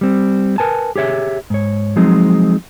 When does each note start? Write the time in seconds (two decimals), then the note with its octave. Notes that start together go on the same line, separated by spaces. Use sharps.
0.01 G3 C4
0.58 A#4 B4 G#5 A5
0.96 G4 G#4 C#5 E5
1.50 G#2 C#5
1.96 F3 F#3 G#3 C4 D#4